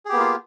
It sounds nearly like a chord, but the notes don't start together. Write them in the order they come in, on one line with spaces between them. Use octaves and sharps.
G#4 G4 B3 A#3 F4